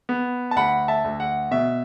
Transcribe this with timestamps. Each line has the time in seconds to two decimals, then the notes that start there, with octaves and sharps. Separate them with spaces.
0.09 B3
0.51 A5
0.56 D2 F#5 B5
0.88 E5 A5
1.04 D2
1.20 F#5
1.51 B2 E5